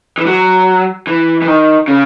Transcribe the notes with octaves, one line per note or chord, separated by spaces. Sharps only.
E3
F#3
E3
E3
D#3
C#3